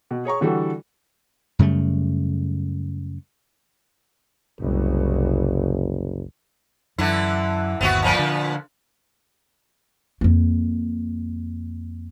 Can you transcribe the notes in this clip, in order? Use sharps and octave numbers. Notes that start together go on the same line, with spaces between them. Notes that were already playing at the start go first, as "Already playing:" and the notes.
B2
G#4 C#5 A#5 C#6
D3 E3 G3 F#4 A4
F#2 C#3 G3 A3
F#1 C2
F#2 D3 E3 E4
G1 D#2 B3 C4 F#4
A#2 F3 B3
D3
F2 A#3